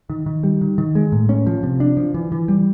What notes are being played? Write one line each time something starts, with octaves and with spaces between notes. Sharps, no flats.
D#3
D#3
G3
D#3
D#3
G#3
A2
C#4
F3
C3
D4
F3
E3
E3
G3